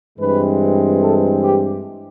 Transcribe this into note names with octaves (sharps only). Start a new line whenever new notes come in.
G2 E3 G#3 C4 B4
A4
G4